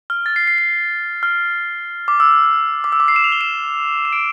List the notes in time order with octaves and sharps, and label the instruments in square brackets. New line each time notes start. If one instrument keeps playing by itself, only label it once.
[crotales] F6
A6
C7
C7
C7
F6
D6
E6
D6
E6
D6
C7
E7
F7
G7
E7
E7
D7